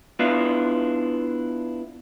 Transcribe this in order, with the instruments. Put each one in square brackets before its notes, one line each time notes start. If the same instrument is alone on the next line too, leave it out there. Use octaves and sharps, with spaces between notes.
[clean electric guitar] B3 D4 E4 F4